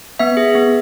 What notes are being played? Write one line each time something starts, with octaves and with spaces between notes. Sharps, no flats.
B3 E5
G#4
B3